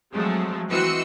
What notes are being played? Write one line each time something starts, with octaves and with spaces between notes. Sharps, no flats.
F3 F#3 G#3 A3 C4
E3 C4 F#4 D#5 E6 C#7